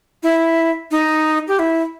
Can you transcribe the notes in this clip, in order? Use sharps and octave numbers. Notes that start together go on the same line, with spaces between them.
E4
D#4
G4
E4